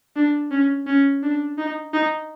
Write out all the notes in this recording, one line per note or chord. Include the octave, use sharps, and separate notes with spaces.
D4
C#4
C#4
D4
D#4
D#4